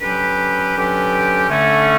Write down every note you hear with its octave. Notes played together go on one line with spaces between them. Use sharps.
D3 F#3 C#4 G4 B4
D3 F#3 C#4 G4 B4
D3 A3 C#4